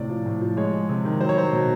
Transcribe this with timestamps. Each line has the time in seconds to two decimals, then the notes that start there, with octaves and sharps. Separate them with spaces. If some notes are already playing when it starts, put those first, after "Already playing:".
Already playing: A2 C3 D5
0.09 F3
0.26 A2
0.41 F3
0.57 G#3 C#5
0.73 G#3
0.89 C3
1.05 D#3
1.21 F#3 C5
1.29 C#5
1.37 F#3 C5
1.53 B2